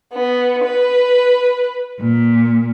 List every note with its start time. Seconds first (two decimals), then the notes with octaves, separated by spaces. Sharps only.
0.13 B3
0.64 B4
2.01 A#2